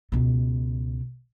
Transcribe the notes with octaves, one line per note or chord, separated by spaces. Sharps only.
C#2 B2